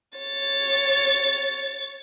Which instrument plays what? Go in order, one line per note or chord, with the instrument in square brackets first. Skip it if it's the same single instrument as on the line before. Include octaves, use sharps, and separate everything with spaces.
[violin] C#5 A6